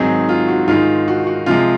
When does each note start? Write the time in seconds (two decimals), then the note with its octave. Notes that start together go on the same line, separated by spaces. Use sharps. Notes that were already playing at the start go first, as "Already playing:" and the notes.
Already playing: G#2 D#3 F#3 C4 D#4 G#4
0.29 F4
0.48 F#4
0.68 G#2 D#3 G#3 F4
1.08 F#4
1.27 F#4
1.46 C3 F3 G#3 F4